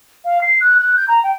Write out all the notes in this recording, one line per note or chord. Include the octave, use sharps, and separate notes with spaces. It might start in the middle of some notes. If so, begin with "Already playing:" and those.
F5
C7
F#6
F#6
G6
A#5
G5